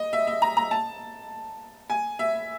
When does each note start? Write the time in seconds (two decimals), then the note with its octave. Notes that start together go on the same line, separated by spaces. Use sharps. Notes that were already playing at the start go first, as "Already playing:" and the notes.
Already playing: D#5
0.13 E5
0.27 E5
0.42 A#5
0.57 A#5
0.71 A5
1.90 G#5
2.19 E5